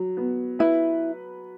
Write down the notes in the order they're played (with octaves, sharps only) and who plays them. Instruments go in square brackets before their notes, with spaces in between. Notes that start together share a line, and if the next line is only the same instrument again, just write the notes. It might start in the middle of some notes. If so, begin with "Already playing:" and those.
Already playing: [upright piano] F#3
B3
[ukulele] E4 [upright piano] B4